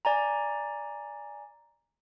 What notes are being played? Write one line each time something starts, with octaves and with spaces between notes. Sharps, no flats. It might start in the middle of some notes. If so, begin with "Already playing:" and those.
D5 G#5 A#5